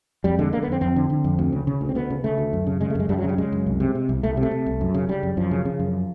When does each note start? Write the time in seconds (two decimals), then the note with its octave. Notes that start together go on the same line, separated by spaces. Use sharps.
0.24 F2 G3
0.39 D3 G#3
0.52 D3 A#3
0.63 B3
0.68 F2 C4
0.81 F2 C4
0.96 D3
1.10 D3
1.24 F2
1.39 D2
1.52 C#3
1.67 C#3
1.81 D2
1.89 C4
1.95 D2 B3
2.10 C#3
2.24 C#3 A3
2.38 D2
2.53 F#2
2.67 C#3
2.80 C#3 G#3
2.90 A3
2.95 F#2 G#3
3.09 F#2 G3
3.18 F#3
3.24 C#3
3.29 G3
3.38 C#3 G#3
3.52 F#2
3.66 C2
3.80 C3
3.95 C3
4.09 C2
4.23 C2 A3
4.37 C3
4.43 A3
4.51 C3
4.66 C2
4.81 F#2
4.94 C#3
5.09 C#3 G3
5.23 F#2
5.37 F#2 F3
5.51 C#3
5.65 C#3
5.80 F#2